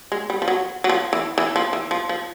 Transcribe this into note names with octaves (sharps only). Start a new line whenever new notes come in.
G#3
G3
F3
F#3
F#3
F3
E3
E3
F3
E3
F3
F3